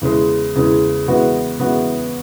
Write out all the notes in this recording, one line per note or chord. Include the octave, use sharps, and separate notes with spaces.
E2 C#3 G#3
E2 C#3 G#3
C#3 E3 G#3 B3 F#4
C#3 E3 G#3 B3 F#4